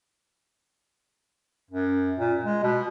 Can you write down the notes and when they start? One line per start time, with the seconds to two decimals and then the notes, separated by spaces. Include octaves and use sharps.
1.70 F#2
2.18 A#2
2.43 G#3
2.63 B2